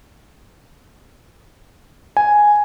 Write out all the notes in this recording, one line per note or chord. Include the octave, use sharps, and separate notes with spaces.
G#5